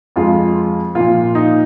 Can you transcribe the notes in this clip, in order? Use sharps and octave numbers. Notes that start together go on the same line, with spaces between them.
F2 F3 G#3 F4
A#2 F3 A#3 F4
D#4